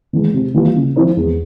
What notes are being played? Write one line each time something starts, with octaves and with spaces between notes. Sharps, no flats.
E3 G#3
C3
E3 G3 A#3 F4
C#3
F3 C4 E4 A#4
E2